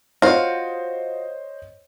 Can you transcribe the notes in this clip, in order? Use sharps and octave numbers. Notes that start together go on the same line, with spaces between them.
F4 F#4 C5 C#5 D#5